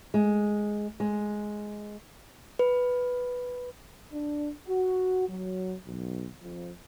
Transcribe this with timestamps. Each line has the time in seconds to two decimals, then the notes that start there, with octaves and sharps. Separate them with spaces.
0.14 G#3
1.00 G#3
2.59 B4
4.13 D4
4.67 F#4
5.29 F#3
5.87 B1
6.42 F2